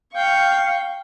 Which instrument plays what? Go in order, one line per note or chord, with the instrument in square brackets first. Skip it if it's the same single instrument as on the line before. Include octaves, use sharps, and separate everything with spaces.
[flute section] F5 [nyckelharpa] G5 C#6